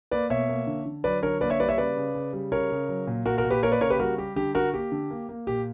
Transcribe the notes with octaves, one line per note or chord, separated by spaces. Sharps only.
A#3 B4 D5
B2 C#5 E5
A#3
D3
D3
F#3 B4 D5
D3 A#4 C#5
A#3 B4 D5
C#5 E5
G3 B4 D5
C#5 E5
C#3 B4 D5
C#3
C#3
G3
C#3 A#4 C#5
C#3
F#3
A#2
A#2 F#4 A#4
F#4 A#4
A#2
G4 B4
A#3 A#4 C#5
B4 D5
C#3 A#4 C#5
G4 B4
G3 F#4 A#4
G3 G4
D3 G4
D3 F#4 A#4
A#3 G4
D3
A#3
A#3
A#2 G4